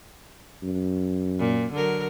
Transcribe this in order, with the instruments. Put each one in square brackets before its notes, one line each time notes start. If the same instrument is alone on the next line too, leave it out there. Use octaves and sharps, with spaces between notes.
[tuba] F#2
[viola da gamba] A#2
D3 F#3 A#4